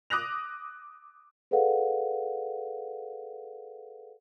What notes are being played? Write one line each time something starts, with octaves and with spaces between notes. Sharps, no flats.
D6 D#6 F#6 A#6 F7
G#4 A4 B4 D5 F5 F#5